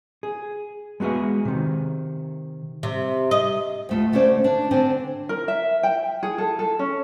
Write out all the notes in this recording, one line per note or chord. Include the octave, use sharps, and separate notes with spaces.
G#4
G#3 B3 F#4 G#4 E5
C3 D#3
C3
D#5
D2 A3 F4
D3 A3 C#4 C5 D5
D4
D3 C4 D4 C5 G#5
A#4
E5
G5
G#4
A4
A4
C#4